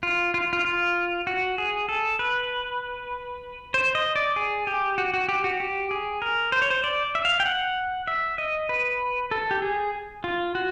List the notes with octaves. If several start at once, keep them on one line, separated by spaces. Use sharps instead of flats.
F4
F4
F4
F4
F#4
G#4
A4
B4
C5
D#5
D5
G#4
G4
F#4
F#4
G4
F#4
G4
G#4
A#4
C5
C#5
C5
D5
E5
F5
G5
F#5
E5
D#5
B4
A4
G4
G#4
F4
F#4